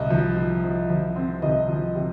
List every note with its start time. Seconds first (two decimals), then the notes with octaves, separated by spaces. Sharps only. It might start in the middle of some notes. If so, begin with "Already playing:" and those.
Already playing: C2 D#5
0.10 F3
0.37 F3
0.64 F3
0.90 F3
1.16 C4
1.42 C2 D#5
1.68 F3
1.95 C3